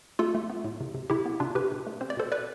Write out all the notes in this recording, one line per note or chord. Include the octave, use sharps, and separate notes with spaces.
A3 F4 A4
A3
B3
A2
C3
C3
C3 E4 G4
B3
C3 D4 F4
C3 G4 B4
B2
A3
C4 C5
D5
B2 A4 C5
B4 D5